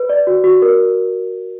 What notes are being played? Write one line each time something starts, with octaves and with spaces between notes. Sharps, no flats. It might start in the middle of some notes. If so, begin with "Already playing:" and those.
Already playing: B4
D5
F#4
F#4
A#4